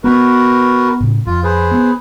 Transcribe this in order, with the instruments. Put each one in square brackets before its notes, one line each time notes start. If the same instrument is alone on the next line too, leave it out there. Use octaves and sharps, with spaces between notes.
[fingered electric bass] B3 [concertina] F#4 A#4 B4
[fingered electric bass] A2 C#3
[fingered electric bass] F2 [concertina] F4
[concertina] G#4 B4 C5
[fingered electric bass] B3